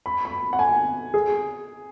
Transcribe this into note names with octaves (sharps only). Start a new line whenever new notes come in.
B5
B5
F#5
G#5
G#4